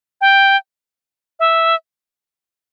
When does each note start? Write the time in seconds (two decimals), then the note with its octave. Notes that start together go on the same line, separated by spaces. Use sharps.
0.21 G5
1.40 E5